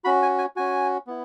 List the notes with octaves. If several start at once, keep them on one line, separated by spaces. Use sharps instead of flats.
C#4 F#4 B5
G#5
G#5
C#4 F#4 G#5
B3 E4